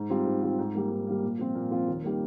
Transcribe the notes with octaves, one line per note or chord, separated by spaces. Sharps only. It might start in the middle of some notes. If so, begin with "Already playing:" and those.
Already playing: G#2
G3 C4 F4
G#2
G3 C4 F4
G#2
G3 A#3
G#2
G3 A#3
A#2
F3 C4 F4
A#2
F3 C4 F4
D#2
D#3 G3 A#3